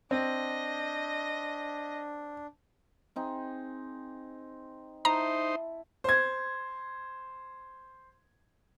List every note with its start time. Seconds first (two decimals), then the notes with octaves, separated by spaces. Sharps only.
0.11 C4 D4 D#5
3.16 C4 D#4 G#4
5.05 D#4 E4 C5 A5 A#5
6.04 C5 G#6